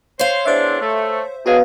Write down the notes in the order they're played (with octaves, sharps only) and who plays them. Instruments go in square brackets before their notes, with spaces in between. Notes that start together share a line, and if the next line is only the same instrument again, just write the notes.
[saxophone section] C5 [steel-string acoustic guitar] C#5 F5
[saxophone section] E2 D4 [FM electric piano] C5 E5
[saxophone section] A3
[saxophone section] B2 F#3 G#4 [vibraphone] B3 B4 F5 [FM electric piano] F#4